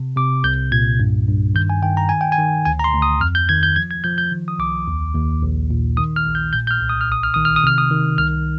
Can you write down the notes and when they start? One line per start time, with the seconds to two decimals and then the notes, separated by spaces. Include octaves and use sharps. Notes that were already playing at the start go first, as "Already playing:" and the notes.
Already playing: C3
0.16 C3 D6
0.44 C2 G6
0.72 A#2 G#6
1.00 G2
1.28 G2
1.55 D#3 G6
1.70 G#5
1.83 D#3 G5
1.97 A#5
2.09 D#3 G#5
2.21 G5
2.32 G#5
2.38 D#3
2.65 D2 G#5
2.79 A#5
2.84 C6
2.93 D2
3.02 D#6
3.20 F2 F6
3.35 G6
3.49 D#3 G#6
3.63 G6
3.76 F3 G#6
3.91 G#6
4.04 F3 G6
4.18 G6
4.31 D#3
4.48 D#6
4.59 C2 D6
4.88 D#2
5.15 D#2
5.42 A#1
5.70 A#2
5.97 D#3 D#6
6.16 F6
6.26 A#1
6.35 G6
6.53 A#2 G6
6.67 G6
6.71 F6
6.81 C2
6.89 D#6
7.01 F6
7.09 A#1 D#6
7.23 F6
7.34 D#3 D#6
7.45 F6
7.56 D#6
7.64 C3 F6
7.78 D#6
7.91 D#3
8.18 C2 F6